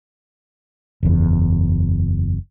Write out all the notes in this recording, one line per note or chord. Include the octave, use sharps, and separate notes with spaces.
F#1 E2